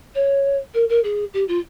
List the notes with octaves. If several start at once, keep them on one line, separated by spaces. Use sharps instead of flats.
C#5
A#4
A#4
G#4
G4
F4